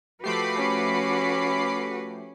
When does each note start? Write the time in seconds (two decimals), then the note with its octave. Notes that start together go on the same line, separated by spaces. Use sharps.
0.24 F3 A3 F#4 G4 B4 B5 D6 C7
0.56 C#4